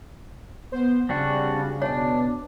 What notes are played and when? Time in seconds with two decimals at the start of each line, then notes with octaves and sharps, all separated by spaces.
0.72 B3 C5
1.09 C#3 G3 C4 D4 F#4
1.82 B2 D4 C#5 G#5